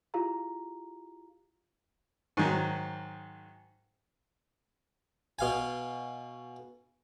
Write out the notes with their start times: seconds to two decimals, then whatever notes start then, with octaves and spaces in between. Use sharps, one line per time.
0.14 E4 F4 G4 G#4 F5 A#5
2.37 G#2 D#3 F#3
5.39 B2 F5 G#5